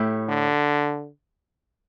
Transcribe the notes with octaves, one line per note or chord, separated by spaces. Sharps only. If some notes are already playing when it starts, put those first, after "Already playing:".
Already playing: A2 A3 E4 G4
D3